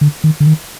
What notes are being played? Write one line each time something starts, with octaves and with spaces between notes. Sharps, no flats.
D3
D#3
D3
D#3